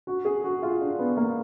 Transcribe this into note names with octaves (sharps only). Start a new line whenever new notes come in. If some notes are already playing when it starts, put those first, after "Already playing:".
F#4
G#4
F#4
F4
D4
B3
A#3